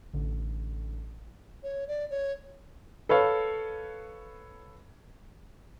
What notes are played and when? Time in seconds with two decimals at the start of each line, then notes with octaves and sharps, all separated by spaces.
0.13 A1 D3
1.63 C#5
1.88 D5
2.10 C#5
3.09 A4 B4 C#5 F5